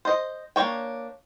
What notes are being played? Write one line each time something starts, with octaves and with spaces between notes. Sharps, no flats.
C5 D#5
A#3 D4 C#5 G5